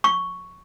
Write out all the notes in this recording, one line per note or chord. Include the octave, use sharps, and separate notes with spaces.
C#6